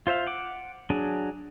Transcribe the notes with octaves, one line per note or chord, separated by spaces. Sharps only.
F4 C5 E5 F5
F#5 D6
F#3 D4 G#4